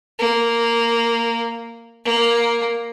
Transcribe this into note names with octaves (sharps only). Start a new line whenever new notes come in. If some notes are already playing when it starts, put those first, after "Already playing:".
A#3
A#3